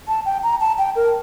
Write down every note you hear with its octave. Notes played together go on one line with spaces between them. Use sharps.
A5
G5
A#5
A5
G5
A#4